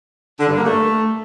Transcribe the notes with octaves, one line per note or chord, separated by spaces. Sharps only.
D3
G2
A#3
A3